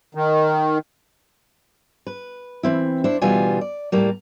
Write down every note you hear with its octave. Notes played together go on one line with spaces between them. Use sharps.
D#3
B4
E3 C4 E4
D4 E4 C5
D2 B2 E3 G3 F4 G#5
D5
A2 G3 A#3